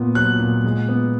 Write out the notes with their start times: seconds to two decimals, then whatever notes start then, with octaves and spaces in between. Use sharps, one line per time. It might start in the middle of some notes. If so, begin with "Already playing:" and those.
Already playing: A#2 B3
0.15 F#3 F#6
0.40 A#2
0.64 G#3
0.88 B3